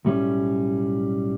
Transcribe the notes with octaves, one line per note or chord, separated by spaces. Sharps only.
B1 A2 G3 C#4